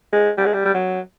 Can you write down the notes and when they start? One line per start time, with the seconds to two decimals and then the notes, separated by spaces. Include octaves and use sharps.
0.13 G#3
0.38 G3
0.46 G#3
0.54 G3
0.65 G3
0.74 F#3